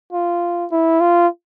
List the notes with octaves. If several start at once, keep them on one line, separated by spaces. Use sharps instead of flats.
F4
E4
F4